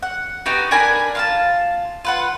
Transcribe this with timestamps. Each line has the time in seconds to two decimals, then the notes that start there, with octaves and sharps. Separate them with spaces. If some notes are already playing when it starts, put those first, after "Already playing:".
0.03 F#5
0.46 B3 D#4 F#4 G4
0.71 D4 A#4 G#5 B5
1.15 F4 F5 A5
2.05 F4 B4 F#5